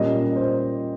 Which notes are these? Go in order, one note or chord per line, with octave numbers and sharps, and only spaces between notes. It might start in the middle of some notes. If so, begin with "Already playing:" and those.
Already playing: A#2 G3 A#3 C#4 D#5
C5